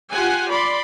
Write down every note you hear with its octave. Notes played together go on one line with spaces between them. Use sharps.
F4 G4 F#5 G#5
D5 B5 C6